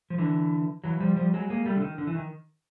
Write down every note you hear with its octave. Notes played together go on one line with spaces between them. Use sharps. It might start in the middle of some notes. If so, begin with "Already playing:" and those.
F3
D3 E3
E3 F#3
F3 G3
F3 G3
F#3 G#3
G#3 A#3
G3 A3
D3
D#3
D3
E3
D#3